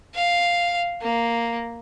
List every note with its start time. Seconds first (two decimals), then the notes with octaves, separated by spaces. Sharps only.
0.15 F5
1.02 A#3